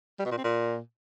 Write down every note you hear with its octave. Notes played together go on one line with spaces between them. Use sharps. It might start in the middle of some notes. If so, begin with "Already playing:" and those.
G3
B2
A#2
C4
A#2